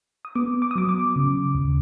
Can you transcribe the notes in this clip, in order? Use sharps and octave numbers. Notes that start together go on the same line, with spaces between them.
D#6
B3 D6
D6
D#6
F#3 D6
D6
C#3
D#2